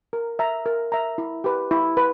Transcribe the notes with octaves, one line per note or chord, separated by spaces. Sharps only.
A#4
E5 A#5
A#4
E5 A#5
E4
G4 B4
E4
B4